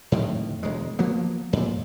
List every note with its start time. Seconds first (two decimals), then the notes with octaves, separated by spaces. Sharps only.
0.12 F2 A2 D3 D#3
0.63 E1 D2 G#3
0.99 F3 A#3 B3
1.53 F2 A#2